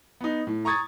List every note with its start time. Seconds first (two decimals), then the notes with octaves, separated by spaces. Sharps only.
0.21 B3 D#4
0.47 A2
0.65 A#5 C#6 D#6 G#6 A6